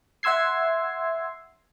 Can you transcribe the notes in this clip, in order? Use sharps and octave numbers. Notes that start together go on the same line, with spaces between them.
E5 F#5 C6 E6 G#6 C7